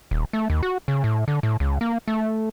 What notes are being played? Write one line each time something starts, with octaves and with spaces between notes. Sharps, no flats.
D#1
A3
D#2
F#4
C#3
A2
D3
A2
C#2
A#3
A3